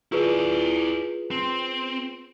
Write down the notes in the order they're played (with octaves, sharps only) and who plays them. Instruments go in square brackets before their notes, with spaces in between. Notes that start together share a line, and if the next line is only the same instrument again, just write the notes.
[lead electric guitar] E4 D5 [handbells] F4 G#4 B4
[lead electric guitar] C4